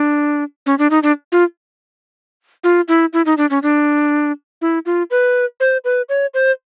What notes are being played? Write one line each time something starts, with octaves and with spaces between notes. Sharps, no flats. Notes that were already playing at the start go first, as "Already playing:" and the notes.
Already playing: D4
C#4
D4
D#4
D4
F4
F4
E4
E4
D#4
D4
C#4
D4
E4
F4
B4
C5
B4
C#5
C5